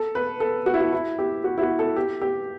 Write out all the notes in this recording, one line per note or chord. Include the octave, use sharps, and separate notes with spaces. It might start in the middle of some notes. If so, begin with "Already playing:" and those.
Already playing: A4
B4
A4
F#4
E4
F#4
E4
G4
F#4
E4
F#4
A4
G4
G4